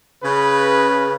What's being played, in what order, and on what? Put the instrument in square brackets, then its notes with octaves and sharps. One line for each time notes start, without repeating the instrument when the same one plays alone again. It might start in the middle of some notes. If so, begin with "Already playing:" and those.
[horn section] C#3 B4